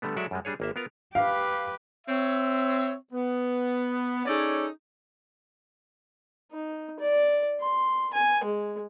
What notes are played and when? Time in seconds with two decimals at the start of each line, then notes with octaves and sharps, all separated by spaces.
0.02 D3 G3 A3 B3
0.16 F#3 G#3 F#4 A4 D5 E5
0.31 F#2 G3 G#3
0.45 G3 D4 G#4 C#5
0.60 G#1 A#3 E5
0.76 B3 F4 A#4 F5
1.15 G4 B4 F5
2.07 C4 C#5 E5
3.13 B3
4.26 C#4 D#4 G#4 A4 C#5 D5
6.52 D#4
6.99 D5
7.61 C6
8.13 G#5
8.44 G#3